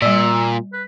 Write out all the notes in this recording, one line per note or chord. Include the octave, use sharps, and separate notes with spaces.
A#2 G3 D5 E6
B4